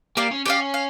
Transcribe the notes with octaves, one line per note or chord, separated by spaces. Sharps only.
A#3 G4 D5 F5
C#4
C#4 G4 D5 F5
F5